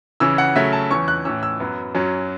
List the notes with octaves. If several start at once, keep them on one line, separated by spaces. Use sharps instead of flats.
C#3 E3 C#4 E6
F#5
C#3 F#3 A3 C#4 E5
A5
E2 E3 C#4 C#6
F#6
A2 E3 C#4 E6
E6
F#2 F#3 B3
F#2 F#3 C#4